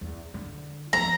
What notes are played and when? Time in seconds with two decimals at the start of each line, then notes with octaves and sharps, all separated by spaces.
0.01 E2
0.34 D3
0.93 F3 B3 A#5